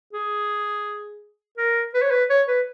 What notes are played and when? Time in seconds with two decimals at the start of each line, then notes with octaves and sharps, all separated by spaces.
0.13 G#4
1.58 A#4
1.94 B4
2.02 C#5
2.11 B4
2.30 C#5
2.48 B4